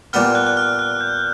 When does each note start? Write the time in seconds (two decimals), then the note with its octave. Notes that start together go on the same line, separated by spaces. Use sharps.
0.13 A#2 G3 B3 F6
0.35 F#6
0.47 F#6
0.57 F6
0.79 F#6
1.01 G6